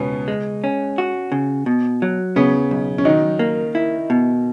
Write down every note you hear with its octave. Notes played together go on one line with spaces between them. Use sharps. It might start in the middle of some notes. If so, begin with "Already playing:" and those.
Already playing: C#2 B2 B3 C#4
G#3
C#4
F#4
C#3
B2
F#3
C#3 B3 C#4
B1
C#4
D#3 F#3 D#4
A#3
E4
B2